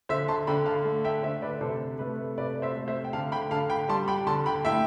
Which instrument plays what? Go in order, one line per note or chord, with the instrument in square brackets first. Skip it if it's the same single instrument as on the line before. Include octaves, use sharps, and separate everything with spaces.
[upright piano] D3 C5 E5
A5 C6
D3 G5 B5
F5 A5
A3
E5 G5
D3 C5 E5
B4 D5
C3 A4 C5
A3 B4
C3 B4 D5
C5 E5
A3
C5 E5
G5
D3 F5 A5
G5 B5
D3 F5 A5
G5 B5
G3 A5 C6
G5 B5
D3 A5 C6
G5 B5
A2 E5 G5